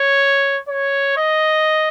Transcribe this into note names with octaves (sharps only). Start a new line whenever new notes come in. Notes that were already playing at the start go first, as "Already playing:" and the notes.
Already playing: C#5
C#5
D#5